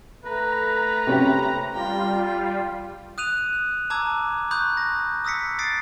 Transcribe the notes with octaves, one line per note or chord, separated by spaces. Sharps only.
A3 B4 A#5
C3 C#4 G4
G3 F4 G5
D#6 F#6 D#7 F7
A5 A#5 D6 E6 G#6
B5 C#6 D#6 F#6 G6
A#6
D#6 E6 A#6 B6 C#7
D#6 A6 C7 D7